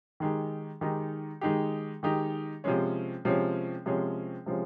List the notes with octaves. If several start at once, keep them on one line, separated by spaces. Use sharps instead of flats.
D#3 G#3 D#4 G4
D#3 G#3 D#4 G4
D#3 G#3 D#4 G4
D#3 G#3 D#4 G4
C3 F3 G#3 C#4
C3 F3 G#3 C#4
C3 F3 G#3 C#4
C3 F3 G#3 C#4